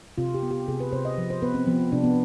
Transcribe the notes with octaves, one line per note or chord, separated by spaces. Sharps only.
C3 F4
G4
B3
G4
C3 G#4
B4
C3 C5
D#5
F3
C5
B3 B4
C4
F3 B3
C3 D4
B3